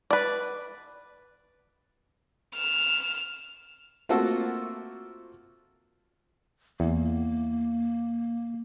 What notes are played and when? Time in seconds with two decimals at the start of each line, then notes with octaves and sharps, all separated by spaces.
0.11 B4 D5
2.55 F6 E7
4.09 A3 A#3 C4 F4 F#4 A4
6.80 E2 A#3